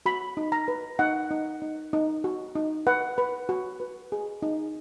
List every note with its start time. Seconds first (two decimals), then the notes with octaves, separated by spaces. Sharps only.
0.06 F#4 B5
0.37 D#4
0.52 A#5
0.68 B4
0.99 D#4 F#5
1.31 D#4
1.62 D#4
1.93 D#4
2.24 F#4
2.55 D#4
2.87 B4 F#5
3.18 B4
3.49 F#4
3.80 B4
4.12 G#4
4.42 D#4